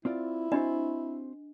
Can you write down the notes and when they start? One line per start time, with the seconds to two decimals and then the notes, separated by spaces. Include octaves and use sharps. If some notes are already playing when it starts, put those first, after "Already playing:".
0.05 C4 E4 F4 D5
0.52 C4 D4 F#4 C5 D#5